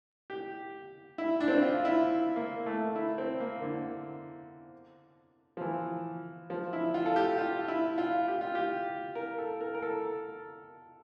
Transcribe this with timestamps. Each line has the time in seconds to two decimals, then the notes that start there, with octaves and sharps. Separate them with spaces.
0.30 G4
1.18 E4
1.40 D4
1.48 C4
1.55 D4
1.63 F4
1.85 E4
2.36 A#3
2.66 A3
2.95 E4
3.18 C4
3.40 A#3
3.62 D3
5.57 F3
5.61 E3
6.50 F3
6.73 E4
6.94 F4
7.06 A4
7.16 G4
7.38 F4
7.68 E4
7.98 F4
8.28 G4
8.41 F4
8.55 G4
9.15 A#4
9.38 A4
9.61 A#4
9.75 A#4
9.82 A4